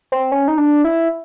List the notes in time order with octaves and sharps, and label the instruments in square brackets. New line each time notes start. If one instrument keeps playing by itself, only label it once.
[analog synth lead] C4
C#4
D#4
D4
E4